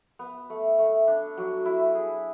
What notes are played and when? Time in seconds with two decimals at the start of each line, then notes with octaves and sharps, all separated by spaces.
0.19 B3
0.50 A3
0.79 A3
1.08 D4
1.37 F#3
1.66 E4
1.95 G#4